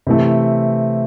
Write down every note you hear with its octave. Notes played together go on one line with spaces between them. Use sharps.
C3 E3 A3